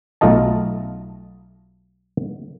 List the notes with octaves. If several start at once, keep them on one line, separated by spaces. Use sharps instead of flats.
B1 A3 F4 D#5 A5